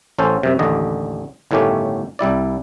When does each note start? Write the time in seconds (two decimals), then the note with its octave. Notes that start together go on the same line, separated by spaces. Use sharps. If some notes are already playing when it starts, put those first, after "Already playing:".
0.18 A1 C#4 A4 C5
0.43 F#2 C3
0.59 A1 D#2 D3 D#5
1.51 G1 A2 D#3 A3 C#4 G4
2.19 C2 G3 E4 D5